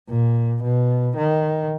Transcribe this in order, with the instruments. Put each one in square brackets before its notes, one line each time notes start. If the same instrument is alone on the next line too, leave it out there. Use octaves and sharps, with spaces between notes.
[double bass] A#2
B2
D#3